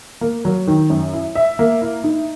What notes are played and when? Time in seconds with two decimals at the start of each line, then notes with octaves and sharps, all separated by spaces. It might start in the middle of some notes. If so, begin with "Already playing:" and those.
0.21 A#3
0.45 F#3
0.67 D#3
0.90 F#2
1.13 E4
1.35 E5
1.59 A#3
1.82 E4
2.04 D#4